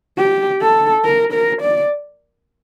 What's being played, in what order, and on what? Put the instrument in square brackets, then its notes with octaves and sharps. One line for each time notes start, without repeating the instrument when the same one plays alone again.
[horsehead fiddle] G4
A4
A#4
A#4
D5